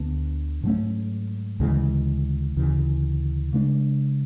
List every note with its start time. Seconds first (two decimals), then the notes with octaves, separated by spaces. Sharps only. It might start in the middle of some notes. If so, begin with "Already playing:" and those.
Already playing: D2 D3 B3
0.63 G#2 F#3 A3 C#4
1.60 D2 C#3 E3 G#3
2.56 D2 C#3 E3
3.53 C#3 G#3 D4